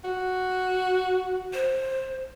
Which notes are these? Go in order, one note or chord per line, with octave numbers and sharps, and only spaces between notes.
F#4
C5